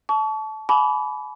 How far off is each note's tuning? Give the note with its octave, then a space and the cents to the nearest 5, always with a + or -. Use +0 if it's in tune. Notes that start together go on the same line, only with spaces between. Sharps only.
A5 -20 C#6 +35
G#5 +45 B5 +0 D6 -30